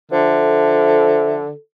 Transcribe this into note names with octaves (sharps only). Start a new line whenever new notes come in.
D3 F3 A4 E5